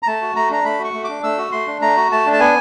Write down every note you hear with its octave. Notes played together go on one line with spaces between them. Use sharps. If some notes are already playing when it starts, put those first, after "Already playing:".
A#5
A3 A5
F#4
A3 A#5
D4 A#5
A3 B5
F#4
C#6
A3
D6
D4
A3 E6
F#4
A3 C6
D4
A3 A#5
F#4
A3 A5
D4
A5
B3 G#5